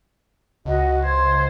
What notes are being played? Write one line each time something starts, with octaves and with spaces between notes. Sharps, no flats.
C#2 F#4 D#5
C5 G#6